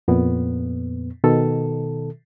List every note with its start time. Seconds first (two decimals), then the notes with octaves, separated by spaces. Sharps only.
0.08 F2 A#2 B3
1.24 B2 D#3 A4